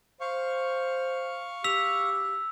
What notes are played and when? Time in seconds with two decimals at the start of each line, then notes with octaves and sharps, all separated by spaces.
0.21 C5 F5 C#6
1.64 G4 E6 B6 F7